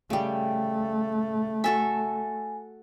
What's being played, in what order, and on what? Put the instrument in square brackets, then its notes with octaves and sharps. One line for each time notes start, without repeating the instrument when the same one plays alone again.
[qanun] C#3 G3 [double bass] A3
[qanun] F#4 A4 E5 [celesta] G#5